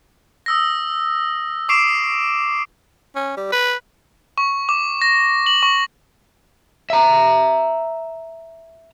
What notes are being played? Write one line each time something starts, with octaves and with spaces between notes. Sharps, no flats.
D#6 E6 A#6
C#6 D6 C7 D7 E7
C#4
G3
B4
C#6
D6
A#6
F#7
C#6
E5 A#5